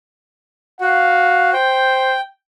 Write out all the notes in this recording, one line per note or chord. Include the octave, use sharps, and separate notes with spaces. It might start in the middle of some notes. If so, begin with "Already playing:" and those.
F#4 F5
C5 G5